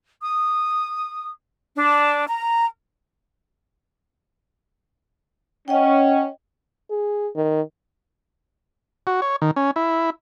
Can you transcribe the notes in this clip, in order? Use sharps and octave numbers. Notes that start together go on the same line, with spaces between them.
D#6
D4
A#5
C#4 D#5 F#5 G5
G#4
D#3
F#4
C#5
D#3
C#4
E4